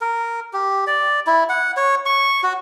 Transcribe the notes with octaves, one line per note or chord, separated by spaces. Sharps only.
A#4
G4
D5
E4
F#5
C#5
C#6
F#4